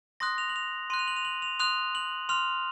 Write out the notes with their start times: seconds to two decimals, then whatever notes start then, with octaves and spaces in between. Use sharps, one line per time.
0.20 C6 D#6 F#6 A#6
0.38 F7
0.49 F#7
0.56 F7
0.90 C6 D#7
0.94 F#6
0.99 F7
1.08 F#7
1.16 F7
1.25 F#7
1.42 F7
1.59 C6 D#6 F#6 F7
1.95 F#7
2.29 C6 F6 F7